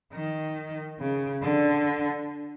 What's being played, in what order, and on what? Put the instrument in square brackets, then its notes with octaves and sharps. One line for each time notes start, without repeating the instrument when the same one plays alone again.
[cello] D#3
C#3
D3